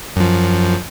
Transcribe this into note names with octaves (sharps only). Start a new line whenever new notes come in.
F#2 F3